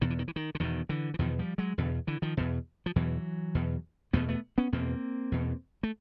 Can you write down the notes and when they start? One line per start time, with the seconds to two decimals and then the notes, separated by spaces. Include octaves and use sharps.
0.01 E2 B2 D#3
0.10 E3
0.19 D#3
0.28 E3
0.36 D#3
0.55 D3
0.60 E2 B2 D#3
0.89 D3 E3
1.14 E3
1.19 E2 B2 D#3 F3
1.39 F3 G3
1.58 F#3 G#3
1.78 E2 B2 D3
2.07 D3 E3
2.22 D#3 F3
2.37 E2 B2
2.86 F3
2.96 E2 B2 E3 F#3
3.55 E2 B2
4.13 E2 B2 A3 B3
4.28 A3 B3
4.58 B3 C#4
4.73 E2 B2 A#3 C4
5.32 E2 B2
5.83 A3